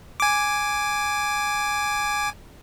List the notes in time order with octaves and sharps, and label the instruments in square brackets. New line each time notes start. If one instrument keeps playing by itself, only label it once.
[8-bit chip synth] G#5 D6